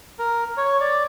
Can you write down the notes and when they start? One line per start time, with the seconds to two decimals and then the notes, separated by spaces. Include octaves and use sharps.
0.19 A#4
0.57 C#5
0.80 D5